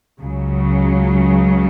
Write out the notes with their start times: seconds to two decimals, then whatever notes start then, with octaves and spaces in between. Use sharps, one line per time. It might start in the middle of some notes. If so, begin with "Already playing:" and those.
0.21 C#2 C#3 F#3